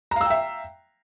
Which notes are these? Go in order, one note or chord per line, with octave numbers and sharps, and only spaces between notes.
E5 F5 G5 A#5 E6